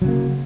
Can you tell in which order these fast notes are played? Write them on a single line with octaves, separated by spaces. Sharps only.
F#3 C#3 A#3